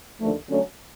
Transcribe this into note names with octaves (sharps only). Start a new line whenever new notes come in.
D#2 D3 F3 A3
D3 F#3 A3 C#4